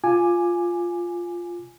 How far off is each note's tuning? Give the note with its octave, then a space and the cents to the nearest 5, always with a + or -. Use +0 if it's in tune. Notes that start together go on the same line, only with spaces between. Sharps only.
F4 +0 G#5 +0 D6 +15